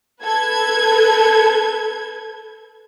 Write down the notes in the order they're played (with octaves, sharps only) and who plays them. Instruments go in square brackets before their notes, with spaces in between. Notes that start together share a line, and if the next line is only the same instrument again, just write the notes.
[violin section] A4 B4 G#6